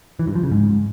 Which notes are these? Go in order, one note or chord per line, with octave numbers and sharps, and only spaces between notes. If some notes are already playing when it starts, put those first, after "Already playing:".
E3
G2
F3
C#3
G#2